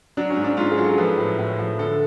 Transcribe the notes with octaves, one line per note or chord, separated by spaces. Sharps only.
F#3 D4
C#4
G#2
D4
G#2 F4
G#4
F#3
A4
F3 B4
A2
A2
F3
D3 A4